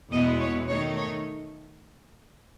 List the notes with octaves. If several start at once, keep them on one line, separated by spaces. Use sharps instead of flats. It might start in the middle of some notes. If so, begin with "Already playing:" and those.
E2 B2 G#3 B3 E4 D#5
C#5
D#3 A3 D#4 C#5
C#5